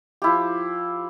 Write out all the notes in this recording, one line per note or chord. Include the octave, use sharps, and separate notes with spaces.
F3 E4 G4